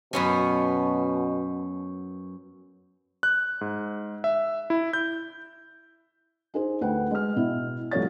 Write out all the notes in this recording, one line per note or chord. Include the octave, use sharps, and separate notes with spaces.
F#2 B2 B3 C#4
F#6
G#2
E5
E4
G6
D#4 G#4 C5
D2 B4 F#5 G5
G#3 F6
B2 E4
C2 F3 A3 C#5 A6